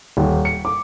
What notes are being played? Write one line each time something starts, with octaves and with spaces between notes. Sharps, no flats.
D#1
C#7
D6